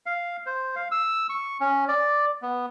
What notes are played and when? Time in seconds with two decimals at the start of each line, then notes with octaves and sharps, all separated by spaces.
0.06 F5
0.46 C5
0.76 F5
0.91 E6
1.29 C#6
1.61 C#4
1.88 D5
2.42 B3